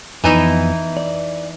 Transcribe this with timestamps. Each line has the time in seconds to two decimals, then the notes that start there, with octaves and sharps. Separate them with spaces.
0.24 F2 E3 B3 D#4 E4
0.97 D5